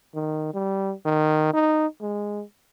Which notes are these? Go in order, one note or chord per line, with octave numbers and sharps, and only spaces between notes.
D#3
G3
D#3
D#4
G#3